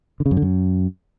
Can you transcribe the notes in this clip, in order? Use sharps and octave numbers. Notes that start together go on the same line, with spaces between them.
D3
C#3
F#2
D3
F#2